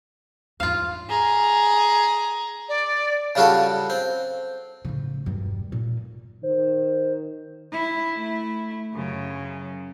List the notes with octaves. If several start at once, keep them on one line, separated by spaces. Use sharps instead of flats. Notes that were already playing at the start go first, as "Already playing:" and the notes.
E2 G#2 F4 F5
G#4 A#5
D5
C#3 G3 F4 F#4 A4
C4
A2 C#3
E1 G2
A#2
D#3 C5
E4
A3 E4
F#2 C#3